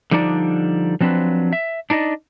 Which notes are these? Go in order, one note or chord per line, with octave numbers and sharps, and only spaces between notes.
D3 F3 G3 D4 D#4 D5
F3 F#3 C4 D4 B4
E5
D4 D#4 D5 D#5